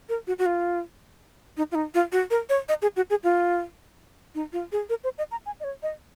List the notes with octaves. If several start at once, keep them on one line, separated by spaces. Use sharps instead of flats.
A#4
F#4
F#4
F4
D#4
F4
D#4
F4
F#4
A#4
C#5
D#5
G#4
F#4
G#4
F4
D#4
F4
G#4
A#4
C5
D#5
A#5
G#5
D#5
C#5
D#5